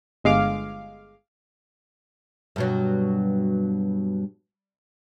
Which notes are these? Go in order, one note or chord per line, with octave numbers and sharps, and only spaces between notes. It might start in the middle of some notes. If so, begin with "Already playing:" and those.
G1 G#3 F5 D6
G2 B2 F#3